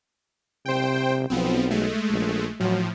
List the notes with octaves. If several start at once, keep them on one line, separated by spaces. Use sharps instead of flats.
C3 C5 G5
B1 F3 B3 C4
G#3 A3
A#1
A2 F3 F#3